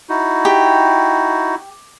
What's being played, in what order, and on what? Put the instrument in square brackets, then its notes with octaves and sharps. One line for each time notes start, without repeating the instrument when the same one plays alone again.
[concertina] D#4 E4 F#4
[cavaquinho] G4